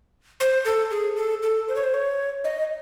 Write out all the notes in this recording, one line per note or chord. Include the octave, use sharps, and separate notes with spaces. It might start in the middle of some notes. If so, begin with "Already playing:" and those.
C5
A4
G#4
A4
A4
C5
C#5
C5
C#5
D#5